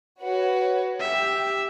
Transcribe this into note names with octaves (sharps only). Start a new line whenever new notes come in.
F#4 B4 C#5
G4 E5